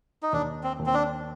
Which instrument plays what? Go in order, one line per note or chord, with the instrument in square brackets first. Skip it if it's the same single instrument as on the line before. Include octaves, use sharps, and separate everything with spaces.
[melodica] D#4
[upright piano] D#2 [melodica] D4
[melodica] C4
[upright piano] D#2
[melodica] C4
D4